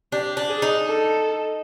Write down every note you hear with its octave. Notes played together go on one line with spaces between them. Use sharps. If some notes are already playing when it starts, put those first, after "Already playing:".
D4 G4
D4
G#4
D#4
A4